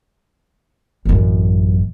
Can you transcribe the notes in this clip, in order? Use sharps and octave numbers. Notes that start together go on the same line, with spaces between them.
A1 F#2